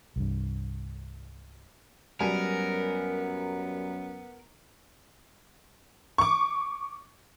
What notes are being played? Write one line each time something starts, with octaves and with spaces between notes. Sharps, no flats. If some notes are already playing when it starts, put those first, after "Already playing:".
C2 G2
F#2 F#3 G3 B3 A#4 G#5
C#6 D6